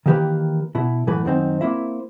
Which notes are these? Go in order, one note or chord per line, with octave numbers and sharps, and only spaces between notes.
D#3 E3 A#3 G4 A#4 B4
B2 E4
F#2 A2 E3 A3 B4 B5
F#2 D#3 C4 D#4
A#3 C4 E4 E5